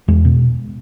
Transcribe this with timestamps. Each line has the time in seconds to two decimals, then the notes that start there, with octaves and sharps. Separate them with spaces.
0.08 E2 G#3
0.25 B2